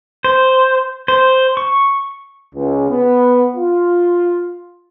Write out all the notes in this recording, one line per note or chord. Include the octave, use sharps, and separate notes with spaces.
C5
C5
C#6
C#2
B3
F4